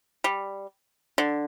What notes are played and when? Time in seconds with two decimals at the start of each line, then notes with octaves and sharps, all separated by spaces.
0.24 G3
1.18 D3